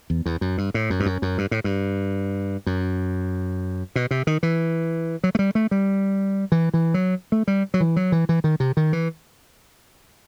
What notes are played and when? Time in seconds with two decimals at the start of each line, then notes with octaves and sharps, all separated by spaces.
0.10 E2
0.26 E2
0.41 F#2
0.58 G2
0.74 A2
0.90 F#2
1.00 G2
1.06 F#2
1.22 F#2
1.38 G2
1.51 A2
1.64 G2
2.66 F#2
3.96 B2
4.11 C3
4.27 D#3
4.43 E3
5.24 F#3
5.35 A3
5.39 G3
5.55 A3
5.71 G3
6.52 E3
6.74 E3
6.94 F#3
7.32 A3
7.48 G3
7.74 F#3
7.80 E3
7.96 F#3
8.12 E3
8.29 E3
8.44 D#3
8.60 C3
8.77 D#3
8.93 E3